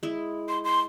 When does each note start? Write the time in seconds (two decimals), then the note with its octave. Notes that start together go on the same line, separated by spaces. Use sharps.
0.03 G#3 E4
0.49 C6
0.64 C6